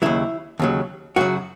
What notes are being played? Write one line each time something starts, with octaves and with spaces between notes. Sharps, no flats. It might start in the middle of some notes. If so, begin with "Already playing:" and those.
D#2 C#3 F#3 E4
D#2 C#3 F#3
F#2 C#3 F#3 F#4